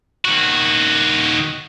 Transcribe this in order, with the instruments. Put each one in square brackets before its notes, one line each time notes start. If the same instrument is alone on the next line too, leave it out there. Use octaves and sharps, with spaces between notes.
[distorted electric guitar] D#3 F#4